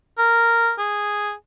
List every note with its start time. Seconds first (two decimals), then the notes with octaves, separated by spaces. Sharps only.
0.18 A#4
0.78 G#4